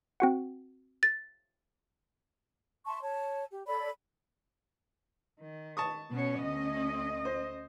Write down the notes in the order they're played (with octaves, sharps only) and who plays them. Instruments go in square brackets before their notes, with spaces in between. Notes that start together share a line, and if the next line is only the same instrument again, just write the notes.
[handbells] C4 F#4 F#5
[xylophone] A6
[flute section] E5 A5 C6 C#6
C#5 A5
G4
A4 C#5 D5 B5
[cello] D#3
[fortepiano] A5 C#6 D#6
[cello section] B2 B3 C#5 [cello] C#4
[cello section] D2 D#5
[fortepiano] C5